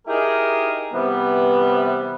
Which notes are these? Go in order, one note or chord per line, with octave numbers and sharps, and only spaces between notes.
D#4 E4 G4 G#4 A#4
C3 E3 G3 B3